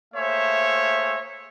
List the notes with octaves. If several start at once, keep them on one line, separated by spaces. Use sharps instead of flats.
A3 A#3 G#4 C5 C#5 E5